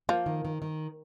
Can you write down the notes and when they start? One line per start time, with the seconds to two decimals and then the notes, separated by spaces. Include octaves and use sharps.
0.09 F3 A#3
0.26 D#3
0.45 D#3
0.62 D#3